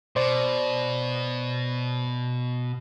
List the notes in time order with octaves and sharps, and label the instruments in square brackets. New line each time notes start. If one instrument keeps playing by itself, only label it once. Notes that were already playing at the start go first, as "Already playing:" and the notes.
[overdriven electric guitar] B2 [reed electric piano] C5 D5